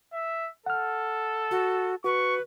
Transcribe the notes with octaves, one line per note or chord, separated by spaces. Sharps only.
E5
A4 F#5 F6
F#4
F#4 B4 C#6